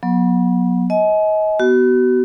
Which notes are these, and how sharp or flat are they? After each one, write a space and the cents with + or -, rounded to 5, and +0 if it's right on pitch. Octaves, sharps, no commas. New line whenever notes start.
F#3 -25 B3 -35
D#5 +30 G#5 +35
B3 +0 F#4 +35